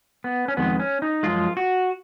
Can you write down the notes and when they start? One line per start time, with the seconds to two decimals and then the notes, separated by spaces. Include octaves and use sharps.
0.24 B3
0.48 C#4
0.57 F2 D#3 G#3 B3
0.80 C#4
1.02 D#4
1.23 F#2 F3 G#3 F4
1.57 F#4